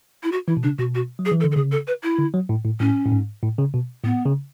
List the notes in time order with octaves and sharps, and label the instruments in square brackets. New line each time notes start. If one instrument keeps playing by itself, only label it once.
[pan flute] E4
F#4
[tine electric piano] E3 [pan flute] E4
[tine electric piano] B2
[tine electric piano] C#3 [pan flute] D4
[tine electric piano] B2 [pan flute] F#4
[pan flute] F#4
[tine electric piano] F#3
[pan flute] G#4
[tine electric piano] E3
[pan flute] A4
[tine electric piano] D3
[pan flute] A4
[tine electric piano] C#3 [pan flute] G#4
[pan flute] A4
B4
E4
[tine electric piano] D3
F#3
A2
A2
[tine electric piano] A2 [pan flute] C#4
[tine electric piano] A2
G#2
A2
C#3
B2
[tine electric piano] A2 [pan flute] B3
[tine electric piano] C#3